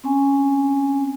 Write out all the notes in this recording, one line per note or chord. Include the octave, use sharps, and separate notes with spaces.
C4 C#4 G#5